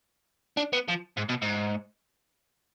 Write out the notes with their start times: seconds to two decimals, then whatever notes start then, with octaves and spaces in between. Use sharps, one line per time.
0.57 D4
0.73 B3
0.89 F3
1.18 G#2
1.29 B2
1.42 G#2